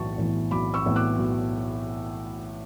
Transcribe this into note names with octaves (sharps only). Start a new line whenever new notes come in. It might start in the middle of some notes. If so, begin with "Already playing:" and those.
Already playing: B1 A2 E3 B3 A5 C#6
A2 E3 B3
B1 B5 D6
C#6 E6
A2 E3 B3
D6 F#6
B1